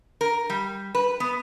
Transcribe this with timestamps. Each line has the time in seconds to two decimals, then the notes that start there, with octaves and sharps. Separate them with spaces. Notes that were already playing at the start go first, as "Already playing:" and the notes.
0.21 A#4
0.50 G3
0.95 B4
1.20 B3